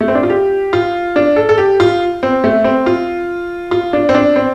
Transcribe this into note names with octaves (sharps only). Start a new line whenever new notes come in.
A3
C4
D4
F4
G4
F4
D4
A4
A4
G4
F4
C4
A3
C4
F4
F4
D4
C4
D4
C4